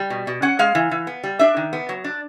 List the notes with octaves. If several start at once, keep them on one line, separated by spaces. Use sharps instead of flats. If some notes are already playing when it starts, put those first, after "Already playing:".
Already playing: G3
B2
B2
C#4 F#5
G#3 F5
E3
E3
B3
G3
D4 E5
D#3
B3
F#3
D4